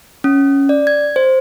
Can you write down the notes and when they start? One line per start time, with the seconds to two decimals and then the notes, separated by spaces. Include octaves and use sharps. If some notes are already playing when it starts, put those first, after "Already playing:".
0.24 C#4
0.69 D5
0.87 G#6
1.16 C5